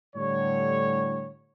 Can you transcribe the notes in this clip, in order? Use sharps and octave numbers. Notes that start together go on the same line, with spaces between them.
A2 D3 G3 C#5